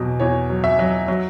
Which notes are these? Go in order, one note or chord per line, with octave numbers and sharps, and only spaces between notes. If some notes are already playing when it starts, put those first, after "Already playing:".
Already playing: E2 B2 F#3
E2 C#5
F#3
E5
F#3
F#3